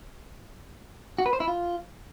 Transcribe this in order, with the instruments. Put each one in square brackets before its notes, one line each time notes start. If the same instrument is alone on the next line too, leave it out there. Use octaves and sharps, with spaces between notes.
[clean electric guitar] F#4
B4
C5
E4
F4